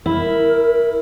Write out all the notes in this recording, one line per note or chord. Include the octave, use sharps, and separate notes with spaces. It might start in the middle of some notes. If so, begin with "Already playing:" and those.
E4 A#4